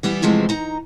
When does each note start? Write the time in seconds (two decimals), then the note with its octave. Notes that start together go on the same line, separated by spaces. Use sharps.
0.03 E3 G3 B3 E4
0.22 C3 E3 F3 G#3 A3
0.49 D#4 A#5